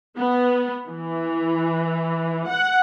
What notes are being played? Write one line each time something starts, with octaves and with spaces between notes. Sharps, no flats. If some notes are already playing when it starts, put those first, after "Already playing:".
B3
E3
F#5